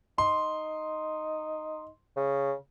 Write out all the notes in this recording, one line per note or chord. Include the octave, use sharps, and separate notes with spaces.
D#4 C6
C#3